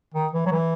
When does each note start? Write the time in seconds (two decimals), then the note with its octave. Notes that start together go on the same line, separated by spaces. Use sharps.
0.14 D#3
0.33 E3
0.46 F#3
0.52 E3